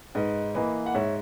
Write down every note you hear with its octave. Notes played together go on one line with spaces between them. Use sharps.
G#2 B4 D#5
E3 A#3 B4 D#5
F#5
G#2 C#5 E5